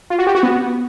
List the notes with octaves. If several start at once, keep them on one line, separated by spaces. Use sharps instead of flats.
F4
F#4
G4
F#4
B3